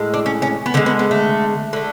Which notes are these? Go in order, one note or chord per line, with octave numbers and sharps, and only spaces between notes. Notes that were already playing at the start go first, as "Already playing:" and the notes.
Already playing: A2 G#3
D4
C#4
C#4
B3
D3 G#3 A3
B3
B3
A3
D3 A3